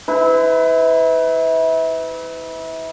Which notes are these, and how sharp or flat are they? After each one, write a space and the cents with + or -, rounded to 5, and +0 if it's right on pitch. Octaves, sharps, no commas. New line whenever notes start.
E4 -30 B4 +30